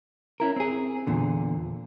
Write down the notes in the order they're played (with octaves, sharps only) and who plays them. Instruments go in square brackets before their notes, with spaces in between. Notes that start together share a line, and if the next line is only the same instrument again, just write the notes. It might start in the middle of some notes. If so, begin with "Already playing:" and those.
[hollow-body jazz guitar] C#4 E4 A#4
C4 G#4
E2 A#2 D3